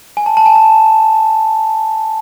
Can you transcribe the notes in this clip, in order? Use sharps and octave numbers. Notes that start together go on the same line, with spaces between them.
G#5
A5
A5
G#5
A5